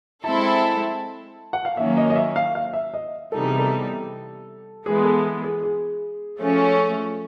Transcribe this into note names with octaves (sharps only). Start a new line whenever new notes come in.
G#3 C4 E4 A4 A5
F#5
F5
D#3 F#3 A#3 C#4 E5
D#5
D#5
E5
F5
F5
E5
D#5
C3 E3 G3 B3 D#4 A4
G#4
A4
E3 G#3 B3 G#4
A4
G#4
G#4
F3 A3 C#4